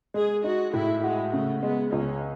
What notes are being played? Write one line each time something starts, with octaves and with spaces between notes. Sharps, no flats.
G#3 G#4
D#4 F#4
A2 E4
G#3 F#4
C#3 A3
G#3 B3
C#2 C#4